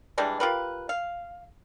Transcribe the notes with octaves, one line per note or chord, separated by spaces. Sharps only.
E3 G3 G#3 D4
F4 G4 A#4 B4
F5